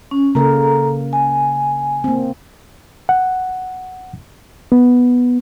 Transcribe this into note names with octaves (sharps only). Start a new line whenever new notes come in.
C#4
C#3 A#3 A4 A#4 A#5
G#5
A#3 C4
F#5
B3